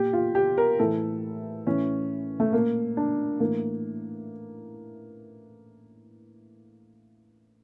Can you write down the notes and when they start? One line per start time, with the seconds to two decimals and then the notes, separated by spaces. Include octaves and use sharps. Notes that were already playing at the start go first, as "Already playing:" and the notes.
Already playing: A#2 G4
0.13 F4
0.35 G4
0.58 A#4
0.79 A2 E3 A4
1.67 A2 E3 C#4
2.40 A3
2.53 A#2 A#3
2.97 D4
3.40 A2 E3 A#3